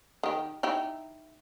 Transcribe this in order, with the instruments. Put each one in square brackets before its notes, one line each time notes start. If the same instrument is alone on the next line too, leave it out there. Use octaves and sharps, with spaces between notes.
[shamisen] D#3 G4
D#4 E4 G4